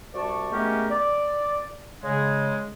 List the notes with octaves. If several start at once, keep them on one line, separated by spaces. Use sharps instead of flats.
C2 F#4 D5 A5 C#6
G#3 A3 B3 C#4 G4 A#4
D5
C#3 G#3